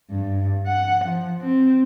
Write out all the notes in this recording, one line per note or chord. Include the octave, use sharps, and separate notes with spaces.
G2
F#5
F3
C4